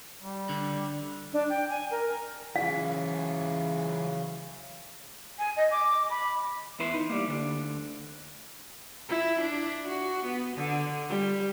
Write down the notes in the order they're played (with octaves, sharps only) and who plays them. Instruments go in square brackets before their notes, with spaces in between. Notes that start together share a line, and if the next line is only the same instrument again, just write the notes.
[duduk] G3
[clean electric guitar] D3
[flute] D4
G5
G#5
A#4
[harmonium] C#3 [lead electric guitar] E3 F#3 [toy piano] F5
[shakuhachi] G#5
D#5
D6
B5
[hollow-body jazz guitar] E2 E4 B4 C6
D#4
G3 A#3
D2 D3
[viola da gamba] E4
D4
F#4
B3
D3
G3